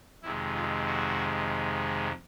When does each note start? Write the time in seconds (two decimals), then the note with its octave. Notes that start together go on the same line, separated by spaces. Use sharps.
0.23 F2 C3 D#3 G#3 E4
0.54 F4
0.86 F#4